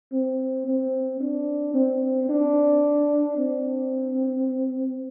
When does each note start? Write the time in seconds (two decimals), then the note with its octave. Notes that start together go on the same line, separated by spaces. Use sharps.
0.12 C4
0.66 C4
1.20 D4
1.74 C4
2.29 D4
3.37 C4